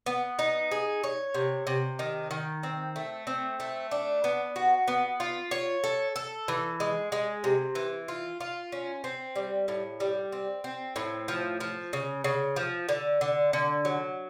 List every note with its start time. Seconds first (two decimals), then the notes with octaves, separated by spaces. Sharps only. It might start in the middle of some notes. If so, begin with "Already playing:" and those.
0.06 B3
0.39 D#4
0.71 G#4
1.04 C#5
1.34 C3
1.67 C3
1.99 D#3
2.31 D#3
2.63 C4
2.96 A3
3.27 C4
3.60 A3
3.91 D4
4.24 B3
4.56 F#4
4.88 B3
5.20 F4
5.51 C#5
5.84 A4
6.16 A4
6.48 E3
6.80 G#3
7.12 G#3
7.44 C3
7.75 E3
8.08 F4
8.40 F4
8.72 C#4
9.04 C4
9.36 G3
9.68 A2
10.00 G3
10.32 C4
10.64 C4
10.96 A2
11.28 F3
11.60 F3
11.93 C#3
12.24 C#3
12.56 F3
12.89 D3
13.21 D3
13.53 D3
13.85 F#3